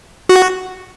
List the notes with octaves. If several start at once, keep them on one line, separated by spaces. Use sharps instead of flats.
F#4